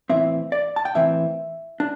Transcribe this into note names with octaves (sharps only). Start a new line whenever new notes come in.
A2 E3 C4 E5
D5
A5
G5
A2 E3 C4 E5
D4